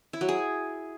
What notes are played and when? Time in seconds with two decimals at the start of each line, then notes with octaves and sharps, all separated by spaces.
0.13 E4
0.21 F#3
0.29 G#4